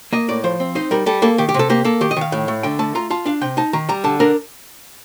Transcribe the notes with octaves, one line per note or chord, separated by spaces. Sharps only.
A#3 D#5
A2 D5
F3 C5
C4
D#4 C5
G3 A#4
G3 A4
A#3 A4
D#3 G4
G4
C3 A4
A#3 G4
A#3 A4
D#3 G4
D#5
D#3 F5
A2
A3
D3 G5
A3 A5
F4 A#5
F4 A5
D4 F5
C3 G5
D#4 A5
D#3 A#5
G3 A#5
D3 A5
D4 A#4